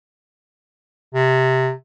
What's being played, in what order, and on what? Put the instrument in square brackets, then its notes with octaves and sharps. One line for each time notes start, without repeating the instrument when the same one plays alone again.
[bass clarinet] C3